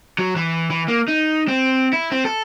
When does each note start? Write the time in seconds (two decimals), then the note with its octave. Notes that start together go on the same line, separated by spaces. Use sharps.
0.18 F#3
0.36 E3
0.70 E3
0.88 A#3
1.08 D#4
1.48 C4
1.93 E4
2.11 C4
2.25 A4